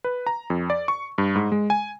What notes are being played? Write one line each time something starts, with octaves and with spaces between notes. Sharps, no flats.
B4
A#5
F2
D5
C#6
G2
G#2
G#3
G#5